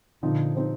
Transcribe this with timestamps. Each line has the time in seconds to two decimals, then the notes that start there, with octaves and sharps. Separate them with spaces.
0.23 A#2 D3 F3 C4 D#4
0.55 F3 C4 D#4